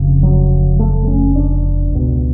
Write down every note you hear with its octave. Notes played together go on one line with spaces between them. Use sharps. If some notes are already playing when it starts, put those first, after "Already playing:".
Already playing: F1 F2 C#3
F#3
A3
C#4
D4
C#2 B2